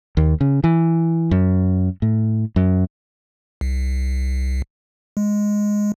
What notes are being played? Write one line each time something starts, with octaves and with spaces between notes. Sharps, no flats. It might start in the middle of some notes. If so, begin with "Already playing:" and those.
D#2
C#3
E3
F#2
A2
F#2
C2
G#3